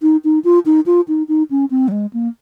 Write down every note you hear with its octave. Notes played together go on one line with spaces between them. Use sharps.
D#4
D#4
F4
D#4
F4
D#4
D#4
C#4
C4
F#3
G#3
A#3